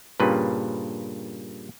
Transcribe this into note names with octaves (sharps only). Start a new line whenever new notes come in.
G2 A#2 C#3 B4